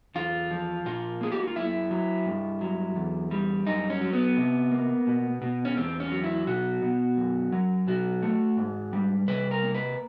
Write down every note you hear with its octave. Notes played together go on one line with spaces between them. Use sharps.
E2 F4
F3
A#2 F4
A#3 G#4
G4
F#4
F4
F#2 E4
F#3
G2
F#3
E2
G3
F#2 D#4
C#4
F#3
B3
C3
A#3
B2
B2
C#4
E2 C4
C#4
F#3
E4
B2 F#4
B2
F#2
F#3
B2 F#4
A3
G#2
G3
C3 B4
A#4
A#3
B4